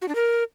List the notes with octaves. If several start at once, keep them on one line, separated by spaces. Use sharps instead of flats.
F#4
D4
A#4